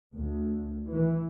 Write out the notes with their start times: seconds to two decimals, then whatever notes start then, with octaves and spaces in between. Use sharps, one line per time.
0.14 D2
0.90 E3